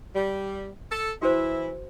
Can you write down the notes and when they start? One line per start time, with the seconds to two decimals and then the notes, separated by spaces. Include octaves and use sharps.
0.16 G3
0.90 A4
1.22 E3 E4 F#4 C5